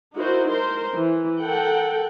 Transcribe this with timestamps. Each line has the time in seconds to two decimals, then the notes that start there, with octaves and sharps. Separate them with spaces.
0.16 D#4 E4 F#4 A#4 C5
0.50 A#4 C5 C6
0.96 E3
1.41 A4 A#4 F#5 G5